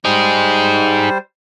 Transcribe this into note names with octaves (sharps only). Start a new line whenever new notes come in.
G3 D#4 G#4 C5